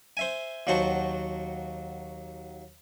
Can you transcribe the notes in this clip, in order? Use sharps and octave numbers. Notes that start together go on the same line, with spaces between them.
C5 E5 G#5
D#2 F#3 F#4 C5 A5 C#6